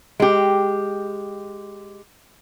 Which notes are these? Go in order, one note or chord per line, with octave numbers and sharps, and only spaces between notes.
G#3 G4